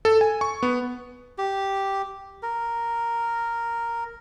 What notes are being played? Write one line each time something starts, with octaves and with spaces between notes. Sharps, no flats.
A4
G#5
C#6
B3
G4
A#4